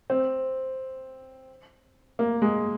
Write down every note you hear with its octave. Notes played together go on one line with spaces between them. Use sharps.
C4
A#3
G#3